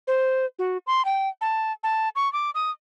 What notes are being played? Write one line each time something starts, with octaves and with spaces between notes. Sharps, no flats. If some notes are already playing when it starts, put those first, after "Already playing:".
C5
F#4
C6
G5
A5
A5
C#6
D6
D#6